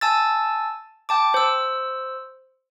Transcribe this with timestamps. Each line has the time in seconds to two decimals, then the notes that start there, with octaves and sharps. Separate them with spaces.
0.01 G#5 A5 E6 A6
1.09 G5 A5 D6
1.34 C5 E6